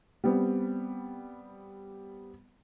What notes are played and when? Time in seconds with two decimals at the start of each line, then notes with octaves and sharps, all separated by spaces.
0.24 G3 B3 C4